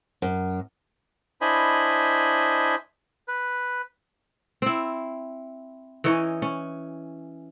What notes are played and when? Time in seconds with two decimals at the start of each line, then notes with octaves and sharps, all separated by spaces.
0.22 F#2
1.41 D4 E4 C5 D#5 G#5 B5
3.28 B4
4.62 C4 E4
6.04 E3 C#4 D#4 C#5
6.42 C#4